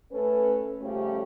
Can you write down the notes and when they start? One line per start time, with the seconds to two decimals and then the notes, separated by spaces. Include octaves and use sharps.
0.12 A3 C#4 A4 B4
0.81 C#3 F3 G3 A3 C#4 G4